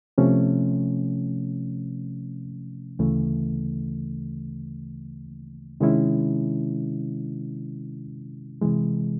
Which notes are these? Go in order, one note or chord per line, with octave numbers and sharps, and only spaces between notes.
C3 F3 A3 C#4
D2 C#3 E3 A3
C3 D#3 G#3 C#4 E4
C3 E3 G#3